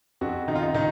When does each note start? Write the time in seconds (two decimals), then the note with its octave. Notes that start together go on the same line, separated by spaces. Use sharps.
0.21 F2 F#4
0.48 D#3 D#4
0.56 F4
0.63 D#4
0.74 D#3 D#4